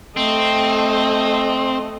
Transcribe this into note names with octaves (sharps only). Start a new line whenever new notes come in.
A3 C4 D#5